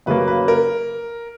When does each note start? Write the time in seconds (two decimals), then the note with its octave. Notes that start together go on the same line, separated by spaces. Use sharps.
0.06 F#2 C#3 F#3 A#3 B4
0.28 B4
0.48 A#4